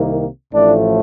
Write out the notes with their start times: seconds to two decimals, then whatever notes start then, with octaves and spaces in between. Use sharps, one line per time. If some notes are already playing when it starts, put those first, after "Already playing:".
Already playing: C2 C3 D#3 A#3
0.51 A1 A2 F3 A3 D4